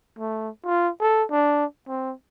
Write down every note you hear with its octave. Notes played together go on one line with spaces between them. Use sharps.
A3
F4
A4
D4
C4